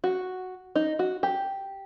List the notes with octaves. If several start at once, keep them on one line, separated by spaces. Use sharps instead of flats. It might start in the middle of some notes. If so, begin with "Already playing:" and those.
F#4
D#4
F#4
G4